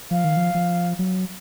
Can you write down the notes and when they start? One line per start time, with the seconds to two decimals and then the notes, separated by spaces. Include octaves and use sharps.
0.11 F3 F5
0.24 D#3
0.37 F3
0.54 F3
0.99 F#3